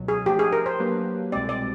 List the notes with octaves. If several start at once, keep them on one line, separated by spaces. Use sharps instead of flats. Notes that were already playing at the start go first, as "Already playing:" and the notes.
Already playing: C#2 B2 F#3
G#4
F3 A3 D4 G4
G#4
A#4
C5
F#3 A#3 D4 G4 B4
C2 B2 G#3 C4 D5
D5